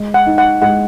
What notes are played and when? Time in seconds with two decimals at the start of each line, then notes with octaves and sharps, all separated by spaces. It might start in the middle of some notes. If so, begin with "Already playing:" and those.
Already playing: G#3
0.14 F#5
0.26 D#4
0.38 F#5
0.62 G#3 F#5